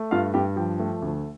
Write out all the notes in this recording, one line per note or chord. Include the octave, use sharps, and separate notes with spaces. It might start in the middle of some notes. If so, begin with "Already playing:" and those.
Already playing: A3
G2 F4 F5
G2 G4 G5
F3 G4 G5
A3
D2